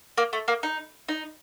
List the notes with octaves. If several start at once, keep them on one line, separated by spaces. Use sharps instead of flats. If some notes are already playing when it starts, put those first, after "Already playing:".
A#3
A3
A#3
D#4
D#4